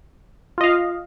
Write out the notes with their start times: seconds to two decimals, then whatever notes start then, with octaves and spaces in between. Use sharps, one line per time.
0.58 F4
0.61 D#5
0.64 F5